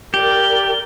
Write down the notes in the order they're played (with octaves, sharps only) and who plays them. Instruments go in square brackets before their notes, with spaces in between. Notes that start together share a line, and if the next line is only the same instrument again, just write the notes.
[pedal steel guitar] G4 [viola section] A#4 D5 [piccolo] G7